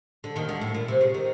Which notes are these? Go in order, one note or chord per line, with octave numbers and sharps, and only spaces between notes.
D3
D#2 D#3
D2 D3
A2
A#2
C3
C#3
D#3